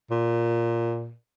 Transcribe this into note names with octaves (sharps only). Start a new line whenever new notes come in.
A#2